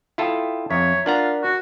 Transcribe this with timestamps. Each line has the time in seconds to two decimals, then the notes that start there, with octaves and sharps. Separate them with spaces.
0.18 E4 F4 A4 E5 G5 D#6
0.71 F2 C#5 E5 A#5 B6
1.06 D4 F4 A#4 D5 F#5 A#5 B6
1.43 F#4